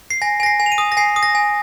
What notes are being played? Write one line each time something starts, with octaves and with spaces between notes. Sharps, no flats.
C7
G#5 A#6
G#5 A#6
C7
G#5
F7
D#7
D#6
A#6
G#5 C7
D#6
A#6
G#5